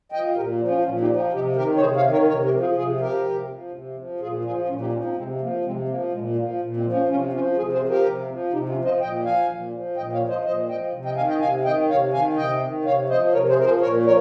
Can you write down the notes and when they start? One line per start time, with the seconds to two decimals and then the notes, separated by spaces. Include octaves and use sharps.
0.12 F3 D#5 G5
0.36 A#2 G4 A#4
0.60 F3
0.68 C#4 F4
0.84 A#2 C#4 F4
1.01 D#4 G4
1.09 F3
1.16 D#4 G4
1.33 C3 D#4 G4
1.56 D#3 G4 A#4
1.76 C#5
1.80 C3 G#4 C5
1.96 C#5 F5
2.04 D#3
2.12 A#4 C#5
2.28 C3 A#4 C#5
2.44 G4 A#4
2.52 F3
2.60 F4 G#4
2.76 C3 F4 G#4
3.01 F3 G4 A#4
3.25 C3
3.48 F3
3.72 C3
3.96 F3
4.20 A#2 F4 G#4
4.45 F3 F4 G#4
4.68 A#2 C#4 F4
4.81 D#4 G4
4.92 F3 C#4 F4
5.04 C4 D#4
5.16 C3 G#3 C4
5.41 F3 A#3
5.65 C3 G#3 C4
5.89 F3 A#3
6.12 A#2 G#3
6.36 F3 A#3
6.61 A#2
6.77 G#3 C4
6.85 F3
6.93 A#3 C#4
7.09 C3 C#4 F4
7.33 F3 C#4 F4
7.57 C3 F4 G#4
7.73 G#4 C5
7.81 F3
7.88 G4 A#4
8.05 C3
8.29 F3
8.53 C3 D#4 G4
8.69 C#4 F4
8.77 F3
8.85 C5 D#5
9.01 A#2 D#5 G5
9.25 F3 F5 G#5
9.49 A#2
9.73 F3
9.97 A#2 D#5 G5
10.13 C#5 F5
10.21 F3
10.29 C5 D#5
10.45 A#2 C5 D#5
10.69 F3 D#5 G5
10.94 C3
11.05 D#5 G5
11.17 D#3 F5 G#5
11.29 D#5 G5
11.41 C3 F5 G#5
11.65 D#3 D#5 G5
11.89 C3 C#5 F5
12.13 D#3 F5 G#5
12.37 C3 D#5 G5
12.62 D#3
12.85 C3 C#5 F5
13.09 F3 C5 D#5
13.33 C3 A#4 C#5
13.49 G#4 C5
13.58 F3 A#4
13.65 G#4 C5
13.81 A#2 A#4 C#5
14.05 F3 A#4 C#5